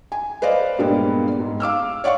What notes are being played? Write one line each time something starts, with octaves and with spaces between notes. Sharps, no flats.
G#5
B4 C5 D5 D#5 F5
G2 A#2 G3 G#3 A#3 B3
G#2
F5 D6 E6 F6
C#5 D5 F5 F#5 C#6